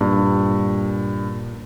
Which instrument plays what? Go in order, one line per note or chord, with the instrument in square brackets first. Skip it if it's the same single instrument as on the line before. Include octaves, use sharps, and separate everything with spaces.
[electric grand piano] G2 [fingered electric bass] A#2